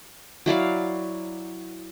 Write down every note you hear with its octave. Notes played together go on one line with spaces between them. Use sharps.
F#3 E4 D5 F5